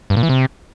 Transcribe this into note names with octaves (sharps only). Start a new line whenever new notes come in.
G2
A#2
E3
C3